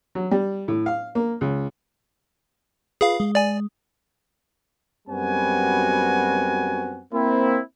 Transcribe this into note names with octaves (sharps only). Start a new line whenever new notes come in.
F#3
G3
A2
F5
A#3
C#2
F4 G#4 B4 F5
G#3
D5 G#5
F#2 G3 B3 C4 F#4 G#5
A#3 C4 E4